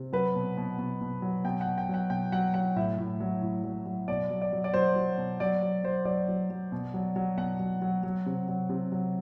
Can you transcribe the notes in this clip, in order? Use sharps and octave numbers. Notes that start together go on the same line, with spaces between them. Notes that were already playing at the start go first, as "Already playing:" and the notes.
Already playing: C3
F#3 B4
B2
B2
B2
B2
F#3
B2 G5
F#5
B2
G5
F#3 F#5
B2 G5
F#3 F#5
F#3 F#5
A2 E5
A2
F#3
A2
F#3
F#3
B2 D5
F#3
D5
F#3
D5
F#3 C5
F#3
B2
F#3 D5
F#3
F#3 C5
F#3 D5
F#3
F#3
B2
F#3
F#3
B2 F#5
F#3
F#3
F#3
C3
F#3
C3
F#3